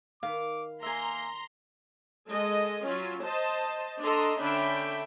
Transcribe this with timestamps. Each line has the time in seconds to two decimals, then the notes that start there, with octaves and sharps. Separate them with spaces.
0.23 D#3 B4 F5 D6
0.83 A#3 E5 G#5 A#5 C6
2.27 G#3 A4 D#5
2.85 F#3 C#4 F4
3.24 C5 D#5 A5
4.01 D4 A4 D#5 A#5 C6
4.40 D3 C#4 D4 E5 G5 B5